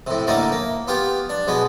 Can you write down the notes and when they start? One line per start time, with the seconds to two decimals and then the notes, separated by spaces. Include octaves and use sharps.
0.07 A2 C3
0.27 A2 D3 A3 A#3 D#4
0.52 A#3
0.88 B3 F4 G4
1.29 D4
1.47 B2 G#3 B3